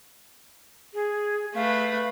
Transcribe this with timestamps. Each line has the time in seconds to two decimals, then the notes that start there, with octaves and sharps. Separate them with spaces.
0.94 G#4
1.55 A3 B4 F5